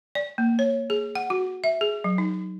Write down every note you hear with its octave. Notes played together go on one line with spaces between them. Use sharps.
D5
A#3
C#5
G#4
F#5
F#4
E5
G#4
F#3
D#4